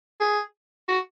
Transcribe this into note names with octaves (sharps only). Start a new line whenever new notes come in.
G#4
F#4